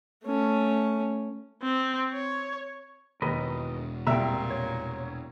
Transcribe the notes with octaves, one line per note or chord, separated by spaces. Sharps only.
A3 C#4
C4
C#5
E1 D#2 A#4 B4 D#5
C2 A#2 E5 G5 A#5 E6
C#5